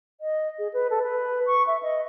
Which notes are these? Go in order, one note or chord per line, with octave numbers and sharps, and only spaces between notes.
D#5
G#4
B4
A4
B4
C#6
E5
D#5